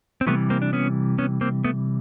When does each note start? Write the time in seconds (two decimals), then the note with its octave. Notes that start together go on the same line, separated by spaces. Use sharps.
0.21 C4
0.27 C3 E3 G3 A3 B3
0.50 A#3 C4
0.62 D4
0.73 B3 C#4
1.18 B3 C#4
1.41 A#3 C4
1.64 A3 B3